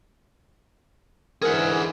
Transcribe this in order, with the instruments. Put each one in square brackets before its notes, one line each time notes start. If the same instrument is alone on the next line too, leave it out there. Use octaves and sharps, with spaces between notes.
[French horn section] G#2 D3 E3 [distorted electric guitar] G#4 F#5 [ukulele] A#4